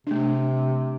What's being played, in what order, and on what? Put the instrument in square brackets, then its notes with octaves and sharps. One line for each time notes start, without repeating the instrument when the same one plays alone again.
[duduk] C3 [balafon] A3 D4